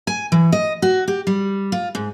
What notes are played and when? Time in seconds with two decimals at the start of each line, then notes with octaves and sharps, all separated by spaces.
0.07 G#5
0.32 E3
0.52 D#5
0.82 F#4
1.08 G4
1.27 G3
1.72 F4
1.95 G#2